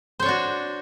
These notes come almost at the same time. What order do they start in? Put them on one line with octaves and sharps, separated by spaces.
C5 C#5 D4 F#4